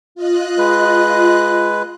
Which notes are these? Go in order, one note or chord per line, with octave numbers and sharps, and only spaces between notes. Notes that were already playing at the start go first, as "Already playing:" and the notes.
F4 D#5 F#6
G#3 B4